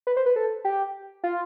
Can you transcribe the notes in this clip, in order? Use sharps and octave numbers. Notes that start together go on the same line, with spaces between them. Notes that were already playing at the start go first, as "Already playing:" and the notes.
B4
C5
B4
A4
G4
F4